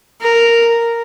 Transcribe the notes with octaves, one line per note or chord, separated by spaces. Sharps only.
A#4